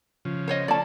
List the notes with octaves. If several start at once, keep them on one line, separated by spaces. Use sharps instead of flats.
C#3 F3
C5 C#5 D#5
A3 C#4 D5 A5